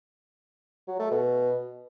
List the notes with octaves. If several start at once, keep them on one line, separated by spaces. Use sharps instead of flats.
F#3
A3
B2